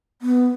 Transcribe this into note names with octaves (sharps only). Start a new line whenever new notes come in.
B3